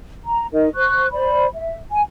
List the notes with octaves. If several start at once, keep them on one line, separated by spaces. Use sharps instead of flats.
A#5
D#4 A#4 D#5
C5 C#6 F#6
C5 D5 B5
E5
G#5